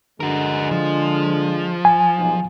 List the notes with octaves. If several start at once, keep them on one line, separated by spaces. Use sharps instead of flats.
D3 G#3 F#4 A#4
F3
G#5
B1 G#2